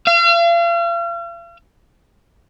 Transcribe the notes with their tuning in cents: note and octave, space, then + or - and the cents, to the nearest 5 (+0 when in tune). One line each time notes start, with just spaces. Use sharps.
F5 -40